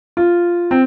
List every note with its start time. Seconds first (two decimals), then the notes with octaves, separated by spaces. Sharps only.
0.17 F4
0.71 C4